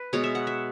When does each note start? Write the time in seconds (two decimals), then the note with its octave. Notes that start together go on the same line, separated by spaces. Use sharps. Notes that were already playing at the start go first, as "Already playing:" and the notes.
Already playing: B4
0.13 B2 G#3 B3 C#5
0.24 E5
0.35 F#5
0.47 E5